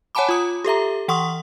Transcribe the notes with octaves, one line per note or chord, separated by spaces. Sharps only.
C#5 F#5 G#5 A5 B5 D6
F4 D#6
G4 A4 E5 A#5
E3 F#5 C6 C#6 D#6